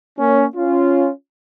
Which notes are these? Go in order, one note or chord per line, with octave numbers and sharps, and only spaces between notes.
A#3 C#4
C#4 F4